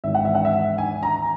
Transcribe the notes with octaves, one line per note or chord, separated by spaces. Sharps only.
G#1 G#2 E3 E5
F#5
E5
F#5
E5
G#5
A#5